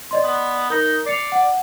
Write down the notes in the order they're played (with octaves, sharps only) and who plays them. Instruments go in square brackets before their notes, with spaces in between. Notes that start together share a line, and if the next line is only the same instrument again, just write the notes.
[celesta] D5 D#5 C6
[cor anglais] B3
[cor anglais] D#4 [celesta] A#4 A#6
[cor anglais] D5 [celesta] C7 C#7 F7
[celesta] F#5